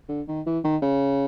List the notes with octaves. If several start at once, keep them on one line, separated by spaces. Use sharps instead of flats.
D3
D#3
E3
D#3
C#3